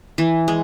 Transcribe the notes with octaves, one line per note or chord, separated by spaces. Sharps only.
E3
G#3